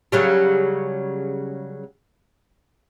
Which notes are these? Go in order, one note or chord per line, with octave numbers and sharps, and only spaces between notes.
C#3 F#3 G3